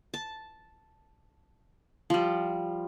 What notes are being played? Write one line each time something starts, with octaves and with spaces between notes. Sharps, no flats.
A5
F3 G3